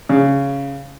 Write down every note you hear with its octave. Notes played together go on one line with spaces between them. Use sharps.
C#3